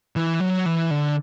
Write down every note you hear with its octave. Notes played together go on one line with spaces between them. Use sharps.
E3
F#3
E3
D3